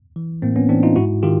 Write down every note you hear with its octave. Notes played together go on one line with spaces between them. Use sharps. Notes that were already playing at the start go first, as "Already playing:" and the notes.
E3
A2 A#3 C4
B3 C#4
E3 C4 D4
D#4 F4
G#2 E4 F#4
D#3 F4 G4